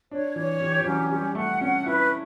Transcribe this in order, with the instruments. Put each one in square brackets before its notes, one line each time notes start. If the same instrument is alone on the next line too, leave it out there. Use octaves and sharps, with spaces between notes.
[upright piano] D4 [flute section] C#5
[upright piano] E3 [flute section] C#5
[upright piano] E3 [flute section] G4
[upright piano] E3
[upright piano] F#3 [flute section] C#4
[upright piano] G3 [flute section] G4
[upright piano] A3 [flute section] F#5
[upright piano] C#4 [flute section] F#5
[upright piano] E4 [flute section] B4